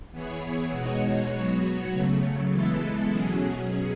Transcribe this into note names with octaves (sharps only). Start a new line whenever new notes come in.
E3 B3 E4 G#4 C#5
B2 G#3 D#4 F#4 C#5
F#3 B3 F#4 C#5
C#3 F#3 A3
E3 G#3 B3 E4 A4
B2 F#3 C#4 G#4